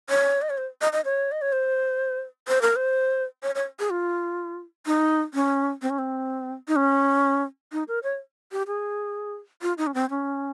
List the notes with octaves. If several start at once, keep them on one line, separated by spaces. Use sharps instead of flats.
C#5
D#5
C#5
C5
D#5
D#5
C#5
D#5
C#5
C5
C5
A#4
C5
C#5
C#5
G#4
F4
D#4
C#4
C4
C#4
C4
D#4
C#4
D#4
A#4
C#5
G4
G#4
F4
D#4
C#4
C4
C#4